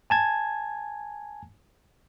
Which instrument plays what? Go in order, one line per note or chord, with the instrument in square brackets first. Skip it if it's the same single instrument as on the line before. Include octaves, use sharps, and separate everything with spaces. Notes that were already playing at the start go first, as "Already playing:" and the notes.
[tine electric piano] G#5 A5 G#6